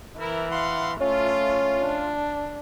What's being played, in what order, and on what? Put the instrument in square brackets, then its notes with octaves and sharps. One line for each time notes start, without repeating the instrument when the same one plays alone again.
[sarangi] E3 [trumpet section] E4 A#4
[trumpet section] F5 F#5 C6
[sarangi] A3 [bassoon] C#4 [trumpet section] F4
[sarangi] D4